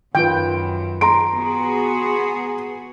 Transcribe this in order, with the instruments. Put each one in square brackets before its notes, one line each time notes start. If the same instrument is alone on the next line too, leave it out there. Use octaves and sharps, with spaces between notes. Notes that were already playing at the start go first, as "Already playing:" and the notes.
[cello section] F#2 [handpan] D#3 F4 B4 [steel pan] G5
[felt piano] A#5 C6 D7
[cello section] B3 F#4 G#4